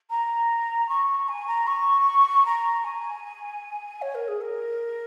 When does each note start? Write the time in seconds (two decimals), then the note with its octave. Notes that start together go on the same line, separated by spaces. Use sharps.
0.10 A#5
0.88 C#6
1.28 G#5
1.47 A#5
1.67 C#6
2.45 A#5
2.84 G#5
4.01 C#5
4.14 A#4
4.28 G#4
4.41 A#4